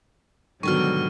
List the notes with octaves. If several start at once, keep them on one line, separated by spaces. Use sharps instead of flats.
G#2 B2 D3 D#3 F#3 G3 C#6 F6